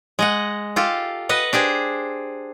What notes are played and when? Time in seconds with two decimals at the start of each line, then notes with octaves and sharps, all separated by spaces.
0.19 G#3 D#5 F#5
0.76 F4 G4 A4
1.29 B4 D#5 F#5
1.53 D4 G4 G#4 C5